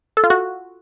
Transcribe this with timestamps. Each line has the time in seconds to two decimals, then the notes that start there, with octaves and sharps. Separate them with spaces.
0.17 A4
0.24 F4
0.30 F#4